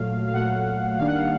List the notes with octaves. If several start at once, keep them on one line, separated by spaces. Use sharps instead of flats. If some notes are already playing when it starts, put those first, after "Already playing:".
Already playing: A#2 F#3 A3 F5
F5
A#2 F#3 A3 F#5
D#3 G3 A#3 D4 F5
F#5
F5